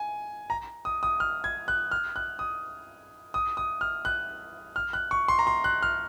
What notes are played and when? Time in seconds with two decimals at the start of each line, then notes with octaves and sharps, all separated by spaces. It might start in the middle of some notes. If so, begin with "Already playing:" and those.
Already playing: G#5
0.50 A#5
0.85 D#6
1.03 D#6
1.20 F6
1.44 G#6
1.68 F#6
1.91 F6
2.16 F#6
2.39 D#6
3.34 D#6
3.57 D#6
3.81 F6
4.05 F#6
4.76 F6
4.93 F#6
5.11 C#6
5.28 C6
5.39 A#5
5.47 C6
5.64 F#6
5.83 F6